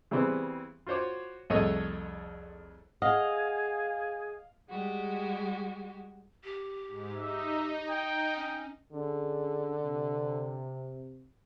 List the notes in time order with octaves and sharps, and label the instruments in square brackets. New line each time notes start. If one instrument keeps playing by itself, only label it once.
[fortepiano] C#3 E3 G3 B3 C4
F4 F#4 C5 C#5 D6
C2 F2 A3 G#4 C#5 D#5
[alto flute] G#4 [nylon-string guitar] D#5 [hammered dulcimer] F5 [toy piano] F#5
[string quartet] G3 G#3 F#4 G4
[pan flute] G4
[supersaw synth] G#2
[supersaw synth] D#4 [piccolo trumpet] E5
[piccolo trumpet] G5
[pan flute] C#4 [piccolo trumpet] G5
[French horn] D3 [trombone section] C#4 G#4
[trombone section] C3